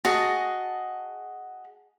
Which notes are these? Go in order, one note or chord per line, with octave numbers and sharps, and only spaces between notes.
F#4 G#4 D#5 A5